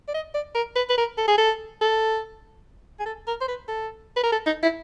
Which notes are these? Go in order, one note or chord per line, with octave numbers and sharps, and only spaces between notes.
D5
D#5
D5
A#4
B4
B4
A#4
A4
G#4
A4
A4
G#4
A4
A#4
C5
B4
A4
B4
A#4
A4
D#4
E4